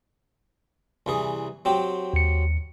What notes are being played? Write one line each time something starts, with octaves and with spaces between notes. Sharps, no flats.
C2 E3 G#4
F#3 C4 G4
D#2 C#7